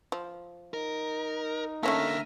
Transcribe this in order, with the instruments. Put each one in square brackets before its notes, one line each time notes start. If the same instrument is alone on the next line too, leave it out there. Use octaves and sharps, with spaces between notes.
[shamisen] F3
[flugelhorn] D#4 [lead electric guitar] A#4
[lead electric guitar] D3 A#3 [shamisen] A3 C#4 A4 [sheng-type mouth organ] E5 A#5 F6